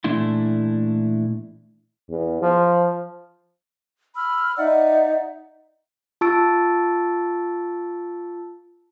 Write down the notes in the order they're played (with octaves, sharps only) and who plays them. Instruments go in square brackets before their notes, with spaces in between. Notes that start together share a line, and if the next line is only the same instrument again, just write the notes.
[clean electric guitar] A#2 E3 A3 D4 E4 C6
[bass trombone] E2
F3
[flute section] B5 E6 F6
D#4 D5 E5 F#5
[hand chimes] F4 A5 C#6 E6 A6 D7